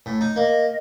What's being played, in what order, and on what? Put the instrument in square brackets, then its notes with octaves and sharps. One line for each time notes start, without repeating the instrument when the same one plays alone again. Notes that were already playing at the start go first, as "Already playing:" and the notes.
[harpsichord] A2
D#4
[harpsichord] A#3 [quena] D#5